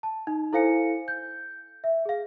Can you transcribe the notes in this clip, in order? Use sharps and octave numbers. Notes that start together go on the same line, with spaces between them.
A5
D#4
E4 A4 C5 F5 G#5 C#7
G6
E5
G#4 F5